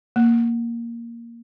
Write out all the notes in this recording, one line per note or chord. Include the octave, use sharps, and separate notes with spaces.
A#3